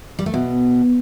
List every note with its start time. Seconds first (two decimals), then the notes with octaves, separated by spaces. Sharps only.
0.19 G3
0.26 A3
0.34 B2